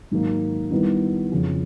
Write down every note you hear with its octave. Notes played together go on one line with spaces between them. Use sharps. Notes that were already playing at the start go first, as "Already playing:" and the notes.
G#2 D#3 F#3 A#3
D#3 G3 B3 E4
F2 C#3 F3